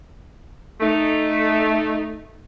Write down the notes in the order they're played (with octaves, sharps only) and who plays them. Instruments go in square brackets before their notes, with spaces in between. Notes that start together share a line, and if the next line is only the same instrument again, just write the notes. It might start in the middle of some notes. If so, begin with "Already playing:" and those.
[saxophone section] A3 D#4